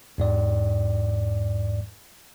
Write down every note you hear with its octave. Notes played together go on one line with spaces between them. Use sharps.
E2 G#2 D5